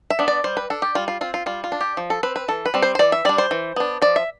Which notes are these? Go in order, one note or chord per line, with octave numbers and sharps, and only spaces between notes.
E5
B3 D4
D5
G3 C5
B4
D4 A4
G4
G3 F4
F4
C4 F4
F4
G3 F4
F4
D4
G4
F3
A4
C4 B4
B4
E3 A4
B4
G3 C4
C5
C5
E3 D5
E5
G3 D4 D5
C5
E3
B3 D4
F3 D5
E5